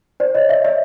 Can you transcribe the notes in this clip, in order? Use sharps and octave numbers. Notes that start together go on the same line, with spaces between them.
C5 D5
C#5 D#5
D5 E5
D5 E5